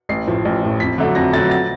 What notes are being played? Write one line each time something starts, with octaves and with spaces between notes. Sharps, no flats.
A1 C7
A2 F3
A1
A2 F3
F2 B6
D3 F#3 A3
F2 A#6
D3 F#3 A3 A6
A6